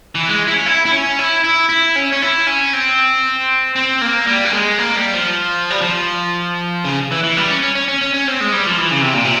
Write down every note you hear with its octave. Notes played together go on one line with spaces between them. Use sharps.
E3
G#3
E4
C#4
E4
E4
C#4
E4
E4
E4
C#4
C#4
E4
C#4
C4
C4
A#3
G3
A#3
G#3
A#3
G3
F3
G3
F3
C#3
E3
E3
G3
C#4
C#4
C#4
C#4
C#4
C#4
C4
G#3
G3
F3
E3
C#3
C3
A#2
C3